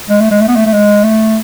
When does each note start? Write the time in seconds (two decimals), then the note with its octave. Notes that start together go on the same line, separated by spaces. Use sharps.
0.10 G#3
0.20 A3
0.31 G#3
0.41 A3
0.48 B3
0.56 A3
0.66 A3
0.73 G#3
1.04 A3